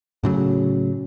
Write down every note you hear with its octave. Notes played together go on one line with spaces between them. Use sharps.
A2 C#3 F#3